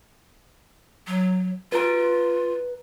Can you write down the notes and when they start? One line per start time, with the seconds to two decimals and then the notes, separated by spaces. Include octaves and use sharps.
1.07 F#3
1.72 F4 B4 A#5